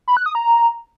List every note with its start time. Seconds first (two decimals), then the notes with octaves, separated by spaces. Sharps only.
0.08 B5
0.17 F#6
0.26 D#6
0.35 A#5